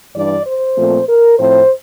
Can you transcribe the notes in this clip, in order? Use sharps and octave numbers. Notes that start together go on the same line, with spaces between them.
G2 E3 G3 D4 D5
C5
A#2 F3 A3 C4
A#4
A2 F3 C4 C5